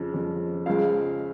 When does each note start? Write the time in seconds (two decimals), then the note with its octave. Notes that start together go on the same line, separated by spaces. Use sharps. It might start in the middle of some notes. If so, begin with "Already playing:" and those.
Already playing: F2 C#3 F3
0.14 F2 C#3 F3
0.66 C#2 C#3 F3 G#3 F5